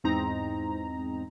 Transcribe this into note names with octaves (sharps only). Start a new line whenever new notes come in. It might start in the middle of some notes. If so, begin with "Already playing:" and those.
E2 G#2 C4 D#4 A#5